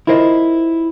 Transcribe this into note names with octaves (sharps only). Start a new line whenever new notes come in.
E4 F4 A#4 C5 D#5